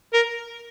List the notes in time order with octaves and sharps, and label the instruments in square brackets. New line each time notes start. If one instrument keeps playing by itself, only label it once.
[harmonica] A#4